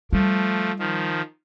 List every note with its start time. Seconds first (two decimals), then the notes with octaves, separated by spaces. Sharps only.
0.13 F3 G3 A3
0.79 D#3 F3